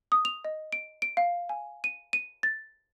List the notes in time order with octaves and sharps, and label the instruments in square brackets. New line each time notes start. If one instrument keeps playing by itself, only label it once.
[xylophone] D#6
F7
D#5
D7
D7
F5
G#5
D#7
D#7
A6